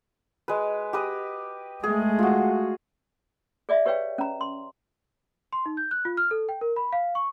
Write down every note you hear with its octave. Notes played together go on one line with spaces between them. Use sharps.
G#3 B4
G4 B4 D#5
G#3 A3 G#4
F4 F#4
G#4 D5 E5
G4 B4 C#5 F5 G5
C#4 A#5
C6
C6
D#4
G6
F#6
F4
F6
A4
G5
A#4
B5
F5
C#6